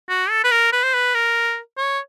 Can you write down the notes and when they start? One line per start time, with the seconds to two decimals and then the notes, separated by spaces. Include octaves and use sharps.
0.09 F#4
0.30 A4
0.44 B4
0.51 A#4
0.73 B4
0.84 C5
0.94 B4
1.14 A#4
1.77 C#5